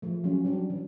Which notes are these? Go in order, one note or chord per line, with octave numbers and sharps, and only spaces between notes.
F3 A3
F#3 G3 C#4
F#3 G3 D4
E3